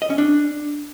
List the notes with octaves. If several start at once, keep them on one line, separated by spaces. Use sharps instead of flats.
D#5
C#4
D4